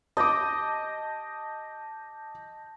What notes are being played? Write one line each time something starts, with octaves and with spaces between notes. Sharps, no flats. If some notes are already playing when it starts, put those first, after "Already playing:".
D#5 A5 D6 D#6 G6 A#6